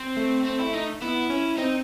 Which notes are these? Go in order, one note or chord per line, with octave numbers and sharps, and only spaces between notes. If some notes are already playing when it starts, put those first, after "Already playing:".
Already playing: C4
A3
C4
E4
D#4
B3 E4
C#4
C4 D#4